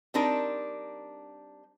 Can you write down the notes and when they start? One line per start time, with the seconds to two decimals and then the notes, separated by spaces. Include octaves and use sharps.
0.14 G3 C4 D4 D#4 A#4